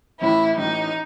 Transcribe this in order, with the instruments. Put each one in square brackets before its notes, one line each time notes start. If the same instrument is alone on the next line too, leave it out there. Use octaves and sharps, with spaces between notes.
[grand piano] A1 A2 E3 [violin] E4
[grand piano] A1 A2 E3 [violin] D#4